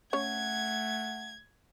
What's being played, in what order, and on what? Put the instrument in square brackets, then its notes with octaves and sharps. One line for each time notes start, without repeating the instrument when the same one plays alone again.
[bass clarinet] A3 [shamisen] C#4 C#5 [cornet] F#5 [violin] G#6